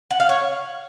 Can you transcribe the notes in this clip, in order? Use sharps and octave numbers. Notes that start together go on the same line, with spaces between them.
F#5
F5
C#5